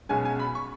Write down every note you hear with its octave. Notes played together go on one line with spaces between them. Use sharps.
B1 B2 G#3 C#4 G#5
G#5
B5
C#6